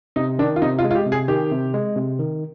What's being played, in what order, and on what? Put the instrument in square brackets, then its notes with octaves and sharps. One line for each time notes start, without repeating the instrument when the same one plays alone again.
[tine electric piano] C3 [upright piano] D#4
[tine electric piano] D#3 [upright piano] D4
[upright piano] F4
[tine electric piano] C3 [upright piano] D#4
[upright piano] F4
[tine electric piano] G#3
[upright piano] F4
G4
[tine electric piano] C3
[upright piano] G#4
[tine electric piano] D#3 [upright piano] G4
[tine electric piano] C3
G#3
C3
D#3